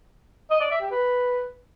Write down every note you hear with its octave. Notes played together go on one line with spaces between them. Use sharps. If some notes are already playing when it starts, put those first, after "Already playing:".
D#5
D5
E5
G4
B4